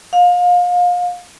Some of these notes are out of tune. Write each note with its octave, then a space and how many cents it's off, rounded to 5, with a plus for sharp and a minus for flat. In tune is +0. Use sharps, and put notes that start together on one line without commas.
F5 +30